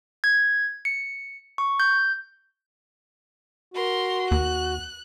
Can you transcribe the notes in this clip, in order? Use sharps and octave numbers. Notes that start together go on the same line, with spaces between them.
G#6
C#7
C#6
G6
F#4 A#4 C6
D#2 F#6